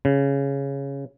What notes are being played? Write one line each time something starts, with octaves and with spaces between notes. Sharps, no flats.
C#3